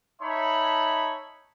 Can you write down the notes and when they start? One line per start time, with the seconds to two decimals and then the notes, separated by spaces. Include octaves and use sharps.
0.22 D#4 C#5 E5 A5 B5